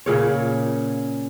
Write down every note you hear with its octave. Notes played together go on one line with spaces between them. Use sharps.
A#2 C#3 C#5